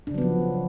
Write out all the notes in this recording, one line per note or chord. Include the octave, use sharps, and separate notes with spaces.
C#3 F3 F#3 B3 D4